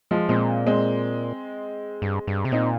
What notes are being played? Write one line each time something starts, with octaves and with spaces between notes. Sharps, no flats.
F3 G#3
A#2 G#3 C4
G#3 C4
G2
G2
C3
A#2 C4 D#4